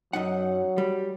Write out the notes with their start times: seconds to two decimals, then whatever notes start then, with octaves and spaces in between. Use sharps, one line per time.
0.13 F#2 F#3 D#4 F#5
0.78 G3